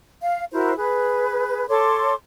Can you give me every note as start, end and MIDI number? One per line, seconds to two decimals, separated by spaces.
0.22 0.44 77
0.52 0.73 64
0.52 0.73 66
0.52 0.73 70
0.52 0.73 72
0.77 1.68 68
0.77 1.68 71
1.69 2.13 69
1.69 2.13 73
1.69 2.13 84
1.69 2.13 86